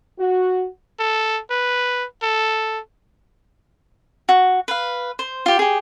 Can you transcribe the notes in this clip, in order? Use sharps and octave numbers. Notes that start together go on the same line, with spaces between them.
F#4
A4
B4
A4
F#4
B4 F5
C5
F4 G4
G4 G#4